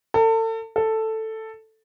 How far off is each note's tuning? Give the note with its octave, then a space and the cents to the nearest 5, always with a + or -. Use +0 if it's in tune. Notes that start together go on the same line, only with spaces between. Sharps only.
A4 +35
A4 +5